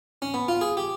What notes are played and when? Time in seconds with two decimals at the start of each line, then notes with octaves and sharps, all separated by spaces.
0.22 C#4
0.34 B3
0.48 F4
0.61 G#4
0.77 G4